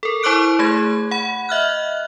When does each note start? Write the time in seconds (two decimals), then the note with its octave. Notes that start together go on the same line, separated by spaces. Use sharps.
0.03 A4 A#4
0.23 E4 C5 C#6 D6 F#6 D7
0.59 A3 G#4 G#6
1.11 F#5 B5
1.49 D#5 E5 F6 F#6